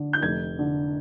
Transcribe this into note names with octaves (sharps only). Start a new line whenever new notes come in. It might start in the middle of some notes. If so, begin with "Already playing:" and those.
Already playing: D3
G6
F1 G#6
D3